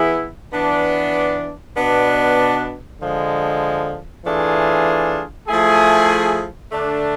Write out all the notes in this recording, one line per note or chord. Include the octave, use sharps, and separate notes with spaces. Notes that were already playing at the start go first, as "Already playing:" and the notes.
Already playing: E3 B3 E4 G#4
E3 B3 D4
B2 B3 D4
D3 F3 G#3
E3 A3 D4 F4 G#4
F3 A3 E4 G#4
D3 A3 D4